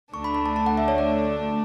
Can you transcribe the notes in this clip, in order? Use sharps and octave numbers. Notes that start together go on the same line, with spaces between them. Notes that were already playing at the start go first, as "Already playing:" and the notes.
D2 D3 A3 D4 C#6
B5
B5
A5
A5
F#5
E5
C#5
D5